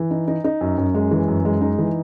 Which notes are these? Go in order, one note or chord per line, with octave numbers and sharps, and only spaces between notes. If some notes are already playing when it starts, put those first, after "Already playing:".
Already playing: E3
D#4
D#4
D#4
F#2
F#2
G#3
E3
F#2
G#3
D#4
E3